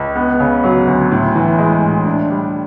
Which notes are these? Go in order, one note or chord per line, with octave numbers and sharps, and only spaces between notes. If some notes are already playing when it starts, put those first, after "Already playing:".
Already playing: C#2
B3
C#3
F#3
D2
A2
E3
G#3
A2
D4
G3